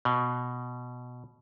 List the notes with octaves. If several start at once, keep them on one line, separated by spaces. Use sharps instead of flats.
B2